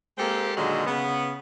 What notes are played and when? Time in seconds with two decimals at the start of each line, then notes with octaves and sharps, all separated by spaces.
0.18 G#3 A#3 C4 G4 A4
0.56 A#2 D3 D#3 F#3 G#3
0.86 C#3 B3